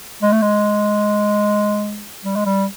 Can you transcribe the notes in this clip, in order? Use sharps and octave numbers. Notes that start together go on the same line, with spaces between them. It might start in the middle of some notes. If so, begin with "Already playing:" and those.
G#3
A3
G#3
G3
G#3
G3